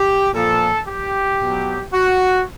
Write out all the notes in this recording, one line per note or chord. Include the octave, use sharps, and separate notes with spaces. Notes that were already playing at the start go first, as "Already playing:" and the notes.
Already playing: G4
A#2 F3 A4
G4
B2 F#3
F#4